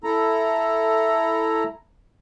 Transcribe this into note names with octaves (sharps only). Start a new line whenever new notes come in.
E4 A4 A#5